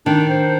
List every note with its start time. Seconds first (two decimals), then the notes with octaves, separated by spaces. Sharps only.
0.06 D#3 D4
0.29 C5